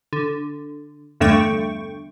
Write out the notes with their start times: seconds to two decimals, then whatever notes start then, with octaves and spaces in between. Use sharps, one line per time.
0.13 D3
1.20 E2 G2 D3 A3 G5 C#6